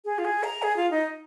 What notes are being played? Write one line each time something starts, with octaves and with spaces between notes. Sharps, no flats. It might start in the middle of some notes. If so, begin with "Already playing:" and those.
G#4
F4
G#4
A#5
G#4
F4
D#4